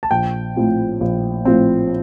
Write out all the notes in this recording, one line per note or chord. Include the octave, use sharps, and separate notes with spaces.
A5
A#1 G5
A2 F3 C4
A#1
A2 F3 C4